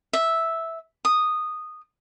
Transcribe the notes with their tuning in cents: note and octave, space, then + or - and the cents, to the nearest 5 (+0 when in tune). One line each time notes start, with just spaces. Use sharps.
E5 -5
D#6 -10